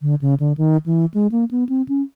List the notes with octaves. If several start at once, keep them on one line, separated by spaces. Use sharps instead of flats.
D3
C#3
D3
D#3
E3
G#3
A#3
B3
C4
C#4